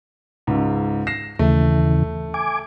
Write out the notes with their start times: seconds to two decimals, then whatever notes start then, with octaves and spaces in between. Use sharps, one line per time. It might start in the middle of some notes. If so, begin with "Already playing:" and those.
0.47 C#2 G#2
1.07 A#6 C7 E7
1.39 D#2 C#3 E3 A3
2.34 G#5 D6